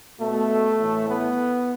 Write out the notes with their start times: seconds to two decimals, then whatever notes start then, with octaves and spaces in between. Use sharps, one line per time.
0.19 B2 A3
0.80 A2 E3
1.08 B3